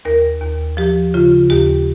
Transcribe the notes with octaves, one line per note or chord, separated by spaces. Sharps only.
D#2 A#4
D#2
F3 G4
C#3 F4
D#2 G4